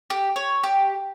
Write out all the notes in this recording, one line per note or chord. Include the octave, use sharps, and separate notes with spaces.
G4
C#5
G4